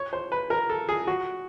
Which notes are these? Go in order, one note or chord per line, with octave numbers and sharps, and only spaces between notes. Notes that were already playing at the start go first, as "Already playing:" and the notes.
Already playing: C#5
C5
B4
A#4
A4
G#4
F#4